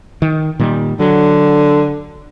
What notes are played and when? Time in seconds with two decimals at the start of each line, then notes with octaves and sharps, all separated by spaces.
0.22 D#3
0.59 A#2 D#3 G3
0.99 D3 F#3